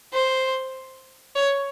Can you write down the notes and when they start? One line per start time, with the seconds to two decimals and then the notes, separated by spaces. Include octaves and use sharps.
0.13 C5
1.35 C#5